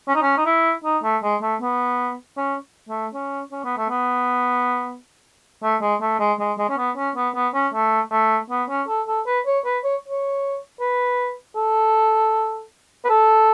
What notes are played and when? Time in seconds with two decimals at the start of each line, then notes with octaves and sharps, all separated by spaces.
0.08 C#4
0.15 D#4
0.22 C#4
0.37 D#4
0.46 E4
0.84 D#4
1.03 A3
1.23 G#3
1.42 A3
1.61 B3
2.37 C#4
2.89 A3
3.14 C#4
3.52 C#4
3.64 B3
3.77 A3
3.89 B3
5.63 A3
5.82 G#3
6.01 A3
6.20 G#3
6.40 G#3
6.58 G#3
6.69 C#4
6.77 B3
6.97 C#4
7.16 B3
7.35 B3
7.54 C#4
7.74 A3
8.11 A3
8.50 B3
8.69 C#4
8.88 A4
9.07 A4
9.26 B4
9.46 C#5
9.65 B4
9.84 C#5
10.08 C#5
10.80 B4
11.56 A4
13.05 B4
13.09 A4